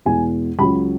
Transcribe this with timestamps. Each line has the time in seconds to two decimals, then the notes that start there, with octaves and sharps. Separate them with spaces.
0.05 E2 B2 G#3 G#5
0.59 C#2 C#3 F#3 B5